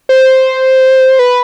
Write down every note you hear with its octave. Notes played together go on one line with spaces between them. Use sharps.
C5
B4